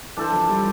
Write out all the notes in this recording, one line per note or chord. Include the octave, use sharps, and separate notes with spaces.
E3 D4 A4 C5
F3
G3